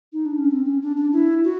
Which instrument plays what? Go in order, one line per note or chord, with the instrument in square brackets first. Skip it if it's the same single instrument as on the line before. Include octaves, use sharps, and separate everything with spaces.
[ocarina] D#4
D4
C#4
C4
C#4
D4
D4
E4
F#4